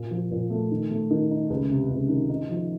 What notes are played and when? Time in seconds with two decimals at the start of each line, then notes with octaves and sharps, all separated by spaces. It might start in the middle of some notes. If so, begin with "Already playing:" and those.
Already playing: A#2
0.11 F3
0.31 A#2
0.50 A3
0.71 D#3
0.91 A3
1.11 D#3
1.31 D#4
1.50 C#2
1.70 C3
1.90 C#2
2.09 D#3
2.29 D#4
2.49 F3